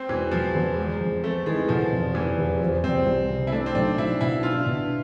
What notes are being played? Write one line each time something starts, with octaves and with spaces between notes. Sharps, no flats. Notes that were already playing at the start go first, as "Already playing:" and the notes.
Already playing: C4
E1 E3
E1 F3
E2
G#3
F2
A3 C4
E3 G#3
B2 F3
F1
F1 E3
E2
F3
C2 C4
C2
C3
E4
A3 D4
C4
B1 D4
B1 E4
B2 E4
D4 F4
B2